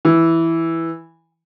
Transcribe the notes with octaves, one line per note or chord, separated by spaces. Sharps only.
E3